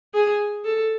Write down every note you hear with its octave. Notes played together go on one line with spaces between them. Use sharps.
G#4
A4